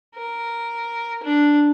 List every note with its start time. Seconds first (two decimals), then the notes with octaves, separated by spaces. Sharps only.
0.15 A#4
1.23 D4